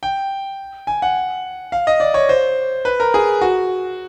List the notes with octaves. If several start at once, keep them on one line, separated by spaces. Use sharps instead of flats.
G5
G#5
F#5
F5
D#5
D5
C#5
C5
B4
A#4
G#4
F#4